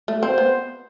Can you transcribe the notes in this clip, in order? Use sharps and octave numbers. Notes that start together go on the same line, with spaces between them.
A3
C4 C5
B3